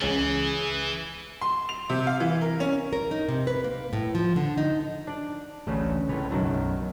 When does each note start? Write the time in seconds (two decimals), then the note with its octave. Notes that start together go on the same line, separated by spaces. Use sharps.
0.01 C#2 E3 C#4 G#4 A6
1.41 C6
1.69 F7
1.89 C3
2.07 F5
2.20 E3
2.41 A#4
2.60 C#4
2.93 A#4
3.11 D#4
3.29 C3
3.47 B4
3.64 A#3
3.93 A2
4.15 F3
4.36 D3
4.58 D#4
5.07 D4 D5
5.67 A1 D2 C#3 A3
6.09 C#2 A2 B4 C#5
6.31 B1 F#2 D#3 F#3 A3